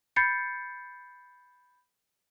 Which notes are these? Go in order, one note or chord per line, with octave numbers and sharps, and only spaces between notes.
B5 G6 A6 C7 C#7